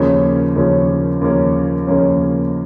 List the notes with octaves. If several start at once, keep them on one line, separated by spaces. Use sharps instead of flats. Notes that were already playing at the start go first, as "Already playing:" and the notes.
Already playing: D#2 C#3 F3 A#3 C#4
D#2 C#3 F3 A#3 C#4
D#2 C#3 F3 A#3 C#4
D#2 C#3 F3 A#3 C#4